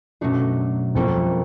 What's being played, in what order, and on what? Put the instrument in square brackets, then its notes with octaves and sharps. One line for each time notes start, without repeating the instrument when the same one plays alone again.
[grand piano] F#2 [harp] B2 F#3 A3 D4
[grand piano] F2 [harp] G3 A#3 C#4 E4 A4